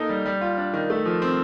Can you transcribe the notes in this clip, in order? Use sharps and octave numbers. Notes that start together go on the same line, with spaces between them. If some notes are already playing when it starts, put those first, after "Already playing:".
Already playing: A#3 D#4 A4
G3
G3
F4
D4
D#3
A3
F3
C4